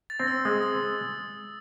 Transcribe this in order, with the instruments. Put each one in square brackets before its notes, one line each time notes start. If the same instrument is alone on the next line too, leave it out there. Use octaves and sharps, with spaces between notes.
[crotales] A6
[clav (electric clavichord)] C4
[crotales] E6
[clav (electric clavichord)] G#3 [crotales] D#6
[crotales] D#6